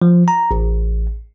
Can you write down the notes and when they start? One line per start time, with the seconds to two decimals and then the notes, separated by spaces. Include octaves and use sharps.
0.02 F3
0.28 A#5
0.51 A1